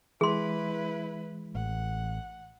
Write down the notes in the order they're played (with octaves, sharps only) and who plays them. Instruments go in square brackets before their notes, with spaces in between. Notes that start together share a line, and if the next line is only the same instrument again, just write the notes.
[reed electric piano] E3 G#3 [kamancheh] E4 B4 [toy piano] G#4 C6
[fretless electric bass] A1 [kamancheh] F#5